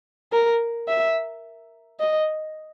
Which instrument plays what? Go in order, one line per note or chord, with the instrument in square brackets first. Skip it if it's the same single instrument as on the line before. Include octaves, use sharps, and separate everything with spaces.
[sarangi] A#4
E5
D#5